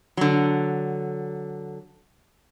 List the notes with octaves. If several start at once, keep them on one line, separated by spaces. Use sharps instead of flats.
D3 F#3